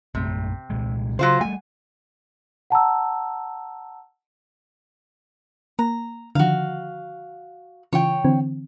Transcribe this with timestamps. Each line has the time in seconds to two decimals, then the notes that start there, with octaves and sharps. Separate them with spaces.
0.15 A#1 F#2 C3 A3
0.70 C2 A#2 G#3
1.19 C#3 F#3 F4 C5
1.41 G3 A3 G#5
2.70 F#5 A5 A#5 E6
5.79 A#3 A#5
6.35 D3 D#3 F3 F#4 F5
7.93 C#3 E3 F4 C#5 G5
8.24 D3 E3 C4